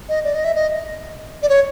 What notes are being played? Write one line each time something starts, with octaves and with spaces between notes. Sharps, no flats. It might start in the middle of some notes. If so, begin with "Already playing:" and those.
D#5
D5
D#5
E5
D#5
D5
C#5